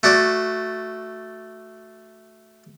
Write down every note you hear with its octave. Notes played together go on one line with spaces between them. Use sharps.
A3 F#4 D5